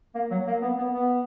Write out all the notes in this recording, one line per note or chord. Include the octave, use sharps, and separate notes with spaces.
A#3
F#3
A#3
B3
B3
B3